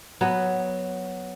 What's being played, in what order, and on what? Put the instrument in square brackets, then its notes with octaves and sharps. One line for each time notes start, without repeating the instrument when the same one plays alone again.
[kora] F#3 B3